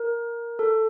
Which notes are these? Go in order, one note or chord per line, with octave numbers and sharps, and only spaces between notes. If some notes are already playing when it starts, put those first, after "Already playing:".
Already playing: A#4
A4